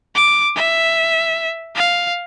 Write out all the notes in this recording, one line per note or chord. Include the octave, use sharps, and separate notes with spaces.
D6
E5
F5